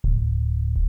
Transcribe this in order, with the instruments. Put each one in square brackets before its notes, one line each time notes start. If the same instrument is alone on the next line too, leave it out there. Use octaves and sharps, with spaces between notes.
[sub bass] D1